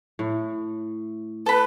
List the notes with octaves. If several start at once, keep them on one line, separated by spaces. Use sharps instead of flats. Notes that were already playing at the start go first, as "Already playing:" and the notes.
A2
A4 B4 B5